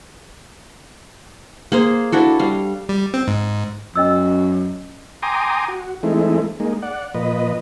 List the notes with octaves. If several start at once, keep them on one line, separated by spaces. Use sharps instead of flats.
A#3 G#4 C5
D4 E4 F#4 A4
G3 F5
G3
C4
G#2
F#2 C#4 D#5 E6
G5 G#5 A#5 C6 D6 D#6
F#4
E3 G#3 A3 C4 D#4 E4
G#3 A#3 D#4
D5 F#5
A#2 F3 B4 D#5